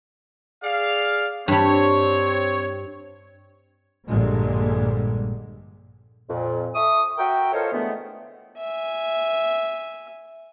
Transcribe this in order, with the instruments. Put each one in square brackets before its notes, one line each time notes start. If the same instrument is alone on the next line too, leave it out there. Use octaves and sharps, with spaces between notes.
[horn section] G#4 D5 F5
[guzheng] G2 G3 [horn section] C4 C#5
[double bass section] A#1 G2 A#2 D3 G3 G#3
[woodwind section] F2 A#2
A4 E5 C#6 D#6
F#4 A#4 E5 G5
F4 A4 A#4 C5 C#5 D#5
D3 E3 G#3 A3 B3
[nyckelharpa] E5 G#5